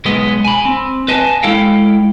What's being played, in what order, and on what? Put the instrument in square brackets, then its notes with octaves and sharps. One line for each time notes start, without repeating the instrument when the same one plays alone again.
[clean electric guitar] B1 G#3 B3 D#5
G#5 B5
C4
B4 D#5 G#5 A5
G#3 E4 A4 F5 G5